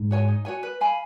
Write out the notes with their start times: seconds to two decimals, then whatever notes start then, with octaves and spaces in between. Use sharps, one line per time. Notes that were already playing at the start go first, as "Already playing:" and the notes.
Already playing: G#2
0.11 F#4 C#5 G#5
0.28 D#4
0.45 F#4 C#5 G#5
0.63 B4
0.81 F5 G#5 B5